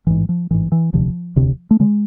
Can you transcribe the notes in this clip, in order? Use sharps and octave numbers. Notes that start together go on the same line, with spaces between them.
A1 G#2 E3
F3
A1 G#2 E3
E3
E1 D2 C3 F3
E1 D2 C3
A3
D3 G#3